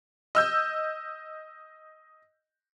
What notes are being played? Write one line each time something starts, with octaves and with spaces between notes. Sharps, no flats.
D#5 E6 G6